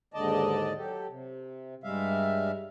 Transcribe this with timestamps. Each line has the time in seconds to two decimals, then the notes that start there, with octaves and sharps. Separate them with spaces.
0.14 D#2 G#2 D3 D5 D#5 A5
0.78 F#3 G4 A4
1.09 C3
1.84 G2 G3 G#3 E5 F5